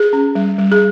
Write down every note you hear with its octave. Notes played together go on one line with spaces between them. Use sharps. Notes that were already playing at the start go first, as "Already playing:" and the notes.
Already playing: G#4
C#4
G3
G3
G#4